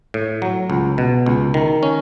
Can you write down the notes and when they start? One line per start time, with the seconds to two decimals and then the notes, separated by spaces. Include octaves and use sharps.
0.14 A2
0.42 F#3
0.70 C#2
0.98 B2
1.26 C#2
1.54 D#3
1.83 C#4